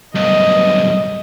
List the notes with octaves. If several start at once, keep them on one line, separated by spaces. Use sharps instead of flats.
B1 G2 D#5